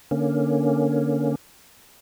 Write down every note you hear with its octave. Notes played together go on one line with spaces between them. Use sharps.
D3 A#3 C#4